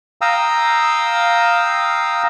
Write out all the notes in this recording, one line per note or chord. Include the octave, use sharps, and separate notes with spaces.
F5 G5 A#5 D#6 E6